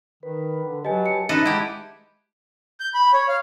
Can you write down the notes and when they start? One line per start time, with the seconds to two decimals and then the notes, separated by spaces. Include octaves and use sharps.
0.23 D#3 B4
0.64 D3
0.85 F#3 G4 B4 D#5 G#5 A5
1.06 C#7
1.29 C#4 D#4 A4 B4 D#5 E5 C6
1.46 G#3 E4 G4 F#5
2.80 G6
2.94 B5
3.13 C#5
3.28 F5